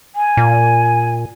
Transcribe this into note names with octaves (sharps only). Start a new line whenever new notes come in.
G#5
A#2